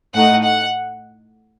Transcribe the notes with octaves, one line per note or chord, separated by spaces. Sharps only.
A2 A3 D#4 F#5
F#5